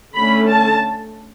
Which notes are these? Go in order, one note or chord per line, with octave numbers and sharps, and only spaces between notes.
D3 A3 C#4 B5
A5